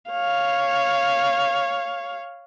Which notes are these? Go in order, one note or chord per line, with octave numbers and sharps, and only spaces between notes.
C#5 F5